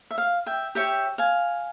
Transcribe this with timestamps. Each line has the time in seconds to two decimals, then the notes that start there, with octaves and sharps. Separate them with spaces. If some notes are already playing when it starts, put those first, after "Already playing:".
0.11 E5
0.18 F5
0.46 E5 G5
0.75 G4 C#5 E5 G5
1.18 F5 G#5